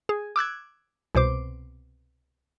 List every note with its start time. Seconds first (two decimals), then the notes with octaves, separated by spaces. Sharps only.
0.09 G#4
0.36 D6 E6 F#6 G#6
1.15 C2 B2 C5 D6